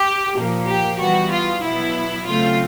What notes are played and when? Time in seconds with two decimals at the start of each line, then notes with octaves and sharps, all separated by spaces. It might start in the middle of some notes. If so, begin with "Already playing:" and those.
Already playing: G4
0.36 A#2 F3 A#3
0.67 G4
0.99 E3 G3 B3 F#4
1.31 F4
1.63 B2 F#3 B3 E4
2.26 C#3 F#3 A3 C4 F4